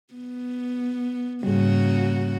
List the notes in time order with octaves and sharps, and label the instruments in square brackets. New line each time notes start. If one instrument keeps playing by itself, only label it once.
[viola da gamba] B3
[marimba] G#2 G3 [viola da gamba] C#3 A#3 F#4